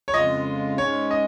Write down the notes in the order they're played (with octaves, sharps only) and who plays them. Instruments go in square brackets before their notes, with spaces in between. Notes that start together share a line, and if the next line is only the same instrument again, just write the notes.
[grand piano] C#5
[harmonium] F2 C#3 G#3 F4 [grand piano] D#5
[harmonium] G#2 G#3 C#4 [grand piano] C#5
[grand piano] D#5